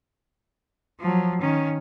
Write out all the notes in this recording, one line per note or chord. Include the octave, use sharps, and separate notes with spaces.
F3 F#3
D#3 C#4